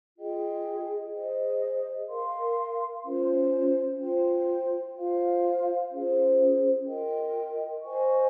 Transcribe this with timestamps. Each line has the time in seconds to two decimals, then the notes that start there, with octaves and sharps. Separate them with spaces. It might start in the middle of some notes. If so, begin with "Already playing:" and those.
0.17 F4 G#4 D#5 G5
1.13 G#4 C5 D#5
2.08 A#4 F5 C6
3.04 C#4 F4 C5
3.99 F4 C5 G5
4.95 F4 C5 F5
5.91 C#4 F4 G#4 C5
6.87 F4 A#4 D#5 G5
7.82 C5 D#5 G#5 C#6